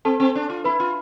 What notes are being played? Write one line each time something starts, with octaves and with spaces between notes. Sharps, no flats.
C4 A4 A5
C4
D4
F4
E4 B4 B5
F4